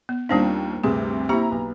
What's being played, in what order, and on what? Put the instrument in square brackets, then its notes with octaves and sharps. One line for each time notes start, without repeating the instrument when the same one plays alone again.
[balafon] B3
[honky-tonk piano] D#2 C4 [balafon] G3 D4 D#4 [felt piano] F4 F5
[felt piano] D2 G2 [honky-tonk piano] C3 [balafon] G#4
[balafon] A#3 G4 B5 [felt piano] C4 E4 [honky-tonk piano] A#5
[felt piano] B1 B4